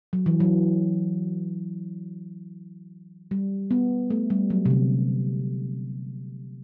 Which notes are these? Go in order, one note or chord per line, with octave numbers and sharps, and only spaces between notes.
F#3
E3
F#3
G3
B3
A3
G3
F#3
C3
D3